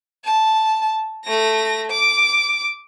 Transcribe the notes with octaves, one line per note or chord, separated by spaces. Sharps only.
A5
A3 A#6
D6